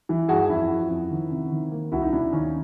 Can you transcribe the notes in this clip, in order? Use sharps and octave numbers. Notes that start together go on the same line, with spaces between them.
E3
G2 F#4 G#4
F2 E4 F#4
F3
F2
D#3
C3
D#3
A#3
C2 E4 F#4
D#4
B2 D4 E4
D#2 C#4 D#4